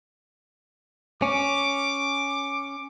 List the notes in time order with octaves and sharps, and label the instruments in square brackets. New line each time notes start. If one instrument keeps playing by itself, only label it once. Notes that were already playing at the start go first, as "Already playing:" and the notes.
[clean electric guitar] C#4 [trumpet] D6